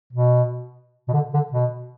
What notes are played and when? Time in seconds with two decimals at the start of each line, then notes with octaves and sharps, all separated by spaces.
0.13 B2
1.08 B2
1.13 D3
1.34 D3
1.53 B2